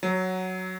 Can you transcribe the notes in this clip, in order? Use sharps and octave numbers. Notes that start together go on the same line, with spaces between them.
F#3